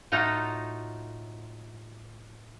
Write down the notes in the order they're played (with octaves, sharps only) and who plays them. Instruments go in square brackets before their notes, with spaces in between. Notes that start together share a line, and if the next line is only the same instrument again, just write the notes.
[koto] A2 D#4 F4 F#4 A4 A#5